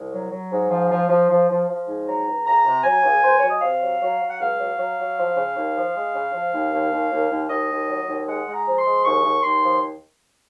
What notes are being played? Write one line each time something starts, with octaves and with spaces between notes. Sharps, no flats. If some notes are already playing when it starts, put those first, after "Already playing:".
Already playing: C2
F#3
F#3
G#2
F3
F3
F3
F3
F3
F3
G#2
F#3 A#5
C#2
C#2 A#5
C3
F#3 G#5
C#2
C#2 C5
C#5
F#3
D#5
C3 F5
F#3
F#3
F#3
F#5
C#2 F5
F#3
F#3
F#3
F3
C#3
D#2
F3
G#3
C#3
F3
D#2
D#2
D#2
D#2
D#2
D#2 D#5
D#2
F#3
D#2
G#3 F#5
G#3
A#5
F3
C6
G#3
D#2 C#6
D#2
D#2 C6
F3